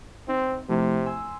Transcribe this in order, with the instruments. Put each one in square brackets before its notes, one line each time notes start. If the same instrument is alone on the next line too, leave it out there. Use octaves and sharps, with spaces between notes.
[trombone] C4 [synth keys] D#4
[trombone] C3 [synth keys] F3 A3 E4
[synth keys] G#5 C6 E6